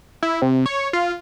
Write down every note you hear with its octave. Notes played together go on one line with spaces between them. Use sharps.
E4
C3
C#5
F4